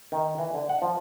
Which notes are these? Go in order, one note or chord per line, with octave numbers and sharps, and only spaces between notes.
D#3
E3
D3
F#5
F3